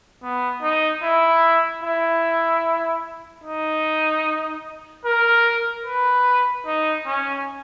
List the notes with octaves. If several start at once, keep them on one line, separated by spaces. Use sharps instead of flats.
B3
D#4
E4
E4
D#4
A#4
B4
D#4
C#4